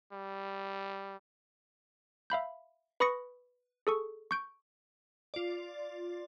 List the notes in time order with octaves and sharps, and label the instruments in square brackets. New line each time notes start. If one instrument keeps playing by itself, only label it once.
[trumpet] G3
[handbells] E5 F5 B5 G6
B4 B5 C#6 D#6 A#6 C#7
G#4 A4 C#6
C#6 G6 D7
[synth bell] F4 D5